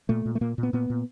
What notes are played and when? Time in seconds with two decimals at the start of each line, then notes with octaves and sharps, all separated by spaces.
0.09 A#2 A3
0.25 A#2
0.35 A3
0.41 A#2 A#3
0.58 A#2
0.63 B3
0.73 A#2 B3
0.90 A#2